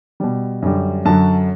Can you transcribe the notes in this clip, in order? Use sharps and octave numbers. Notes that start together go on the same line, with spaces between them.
B2 G3
F#2 D3 G3
F#2 D3 F#3 A5